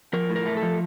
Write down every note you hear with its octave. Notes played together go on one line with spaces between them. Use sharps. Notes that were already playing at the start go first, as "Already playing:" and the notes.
F3 A#4
A2
A#4
A3
A4
F3